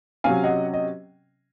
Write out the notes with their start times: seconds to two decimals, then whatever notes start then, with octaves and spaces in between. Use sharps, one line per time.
0.24 C3 F#3 C#4 F5 G#5
0.44 D#5 F#5
0.74 D#5